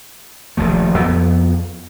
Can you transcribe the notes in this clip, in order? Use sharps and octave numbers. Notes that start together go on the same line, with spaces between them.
D#1 A#1 F3 A3
F2 F3 B3